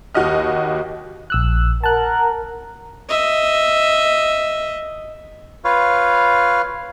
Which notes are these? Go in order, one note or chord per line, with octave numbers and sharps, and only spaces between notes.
D#2 F#4 G4 D#5 F6
A#1 E6 F#6
A#4 F#5 A5 F#6
D#5 E5
F4 B4 C#5 F5